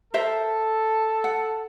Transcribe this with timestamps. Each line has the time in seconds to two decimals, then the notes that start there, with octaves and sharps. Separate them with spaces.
0.14 A4 A#4 C5 E5
1.24 F#5